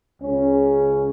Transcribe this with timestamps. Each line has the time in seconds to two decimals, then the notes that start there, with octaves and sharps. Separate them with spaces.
0.21 C#2 C#3 C#4